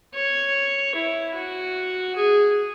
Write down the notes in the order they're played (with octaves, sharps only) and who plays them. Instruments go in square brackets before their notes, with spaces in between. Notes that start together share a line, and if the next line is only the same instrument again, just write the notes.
[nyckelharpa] C#5
E4
F#4
G#4